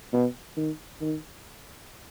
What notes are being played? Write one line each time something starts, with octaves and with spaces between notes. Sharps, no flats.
B2
D#3
D#3